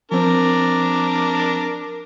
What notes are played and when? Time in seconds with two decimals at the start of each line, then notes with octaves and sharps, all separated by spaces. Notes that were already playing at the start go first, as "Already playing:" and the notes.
0.12 F3 C4 D4 A#4